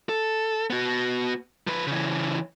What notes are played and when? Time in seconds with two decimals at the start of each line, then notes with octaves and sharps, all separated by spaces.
0.09 A4
0.70 B3 F#4
1.67 F3 B4
1.87 C#3 E3